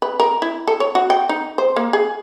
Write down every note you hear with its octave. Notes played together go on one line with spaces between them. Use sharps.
B4
A#4
E4
A4
C#5
F#4
G5
D#4
C5
A#3
G#4